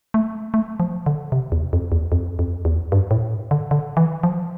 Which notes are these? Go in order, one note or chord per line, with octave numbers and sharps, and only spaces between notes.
A3
A3
F3
D3
C3
E2
F2
E2
F2
F2
E2
G2
A2
D3
D3
E3
F3